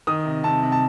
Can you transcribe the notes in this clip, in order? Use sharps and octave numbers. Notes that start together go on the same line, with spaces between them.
D#3 D#6
C3
C3 A5
C3
A5